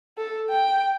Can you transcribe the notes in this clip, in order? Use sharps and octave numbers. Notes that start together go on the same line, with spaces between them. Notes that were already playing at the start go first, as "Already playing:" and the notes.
A4
G5